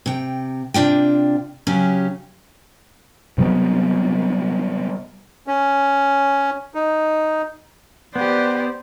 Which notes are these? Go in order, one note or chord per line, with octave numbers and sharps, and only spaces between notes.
C3 G5
C3 D4 F4 G5
C#3 F#3 C#4 G4
C3 F#3 G3 B3
C#4
D#4
B3 G4 B4 C5 D5